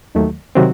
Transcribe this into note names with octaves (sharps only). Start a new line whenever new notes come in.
D#2 D#3 F#3 A3
C3 D#3 F#3 C4 F#4